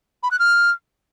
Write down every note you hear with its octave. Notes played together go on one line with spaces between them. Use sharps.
B5
F#6
F6